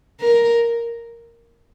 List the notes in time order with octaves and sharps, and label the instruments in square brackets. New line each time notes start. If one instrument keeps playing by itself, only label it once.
[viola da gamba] A#4